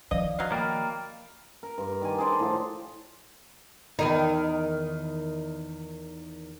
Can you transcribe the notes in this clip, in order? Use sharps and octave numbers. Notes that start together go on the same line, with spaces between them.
D#3 F3 D5 D#5 F5
F#3 D#5 F5
A#3 G5 B5 A6
A#4
G2
D#3 D5 G#5
G#4 C5 D5 A5
A2 F3
E2 D#3 D#4